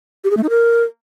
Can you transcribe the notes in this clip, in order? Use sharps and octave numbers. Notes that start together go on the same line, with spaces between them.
G4
G#4
A3
D#4
A#4